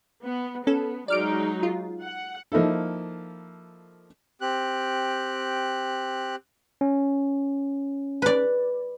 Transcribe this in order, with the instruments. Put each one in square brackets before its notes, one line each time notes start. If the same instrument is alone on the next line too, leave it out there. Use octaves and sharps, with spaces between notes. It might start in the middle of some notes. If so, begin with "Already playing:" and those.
[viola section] B3
[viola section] B3 [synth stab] C#4 A4
[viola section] F#3 G#3 D#4 [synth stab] D5 F6 D7
[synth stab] F4
[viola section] F#5
[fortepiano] F3 A#3 D#4 E4 A4
[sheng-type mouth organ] C4 G4 F#6
[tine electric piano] C#4
[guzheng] B4 D5